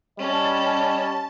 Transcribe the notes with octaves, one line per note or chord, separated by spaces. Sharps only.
G3 C#4 D#5 A5